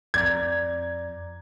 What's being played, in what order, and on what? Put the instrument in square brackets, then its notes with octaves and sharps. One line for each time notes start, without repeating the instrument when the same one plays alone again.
[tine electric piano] F2 D5 A#5 [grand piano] G#6